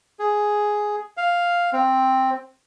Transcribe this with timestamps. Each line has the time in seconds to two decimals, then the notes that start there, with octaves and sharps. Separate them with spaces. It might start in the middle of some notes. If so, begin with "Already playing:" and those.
0.19 G#4
1.17 F5
1.73 C4